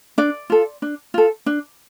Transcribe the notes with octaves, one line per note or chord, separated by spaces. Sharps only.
D4 D5
F4 A4
D4
F4 A4
D4